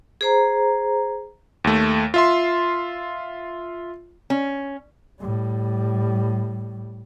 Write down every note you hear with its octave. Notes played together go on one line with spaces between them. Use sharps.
G#4 C5 A#5
D#2 A3
F4 E5 C6
C#4
A2 G3